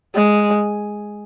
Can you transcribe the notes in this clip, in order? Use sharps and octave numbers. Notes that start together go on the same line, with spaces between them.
G#3